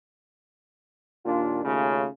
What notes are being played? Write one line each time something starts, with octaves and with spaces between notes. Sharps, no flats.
D#2 A#2 D4 F4
D#2 C#3 A3 C#4 F4